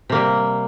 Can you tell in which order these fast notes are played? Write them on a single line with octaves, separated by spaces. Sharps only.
C3 A#3 G3